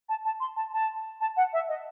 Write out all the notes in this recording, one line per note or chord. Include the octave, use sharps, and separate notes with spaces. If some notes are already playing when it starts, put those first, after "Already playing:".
A5
A5
C6
A5
A5
A5
F#5
E5
D#5